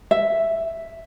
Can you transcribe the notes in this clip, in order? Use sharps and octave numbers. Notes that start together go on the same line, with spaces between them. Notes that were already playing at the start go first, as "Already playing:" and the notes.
E5